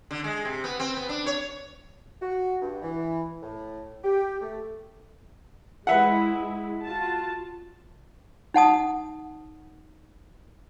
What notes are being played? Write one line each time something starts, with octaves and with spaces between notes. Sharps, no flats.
D3
G#3
C3
B3
C4
B3
D4
C#5
F#4
G2
E3
A2
G4
A3
G#3 E4 B4 E5 F#5
F4 F#4 A5
D#4 F#5 A5 D#6